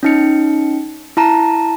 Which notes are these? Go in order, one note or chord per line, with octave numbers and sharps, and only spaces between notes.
C#4 D#4 C#7
E4 A5 A#5